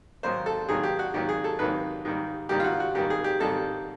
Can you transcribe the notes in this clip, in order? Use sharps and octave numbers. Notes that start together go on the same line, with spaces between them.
G#2 D#3 F#3 A#3 C5
A4
G#2 D#3 F#3 A#3 G#4
G4
F#4
G#2 D#3 F#3 A#3 G4
G#4
A4
G#2 D#3 F#3 A#3 B4
G#2 D#3 G3 A#3
G#2 D#3 G3 A#3 G4
F4
F#4
F#4
G#2 D#3 G3 A#3 G4
G#4
G4
G#2 D#3 G3 A#3 A4